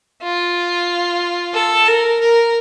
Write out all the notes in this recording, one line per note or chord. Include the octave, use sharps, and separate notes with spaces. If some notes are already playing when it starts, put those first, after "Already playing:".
F4
A4
A#4
A#4